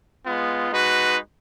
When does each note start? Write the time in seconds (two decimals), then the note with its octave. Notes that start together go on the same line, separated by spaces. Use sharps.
0.23 G#3 B3 F4
0.71 G#3 D#4 F#4 B4